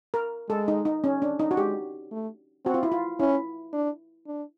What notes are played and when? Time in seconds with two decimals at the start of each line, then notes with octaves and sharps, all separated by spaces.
0.14 A#4
0.49 G#3 A4
0.68 D#4
0.85 D#4
1.04 C#4
1.22 D4
1.40 D#4
1.51 F#4
1.57 G#3 G4
2.11 A3
2.65 C4 F#4
2.74 F4
2.83 E4
2.92 F4
3.20 C#4 E4
3.73 D4
4.27 D4